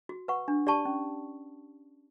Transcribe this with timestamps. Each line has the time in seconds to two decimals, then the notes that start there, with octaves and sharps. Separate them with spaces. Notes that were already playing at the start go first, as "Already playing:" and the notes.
0.09 F#4
0.28 B4 F#5 C#6
0.48 D4
0.67 G4 D5 A5 C#6
0.85 C#4